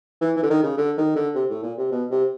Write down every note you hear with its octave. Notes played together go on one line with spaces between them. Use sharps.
E3
E3
D3
D#3
C#3
D3
D#3
D3
C3
A2
A#2
C3
B2
C3